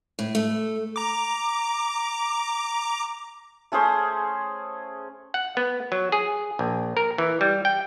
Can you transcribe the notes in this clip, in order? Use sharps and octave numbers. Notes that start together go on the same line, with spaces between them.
A2
A3
A#5 D6
A3 C#4 G#4 C5
F#5
B3
F#3
G#4
A#1
A#4
E3
G3
G5